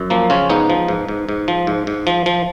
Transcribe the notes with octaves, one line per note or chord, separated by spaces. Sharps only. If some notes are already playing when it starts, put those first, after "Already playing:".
Already playing: F#2
F3 A#3
C#3 C#4 F4
G#2 B3 D#4
F3
G#2
G#2
G#2
F3
G#2
G#2
F3
F3